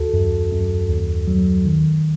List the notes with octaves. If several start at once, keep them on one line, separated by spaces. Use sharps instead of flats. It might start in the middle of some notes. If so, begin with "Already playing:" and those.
Already playing: D#2 F#4 A4
F#2
F#2
D#2
F#3
D#3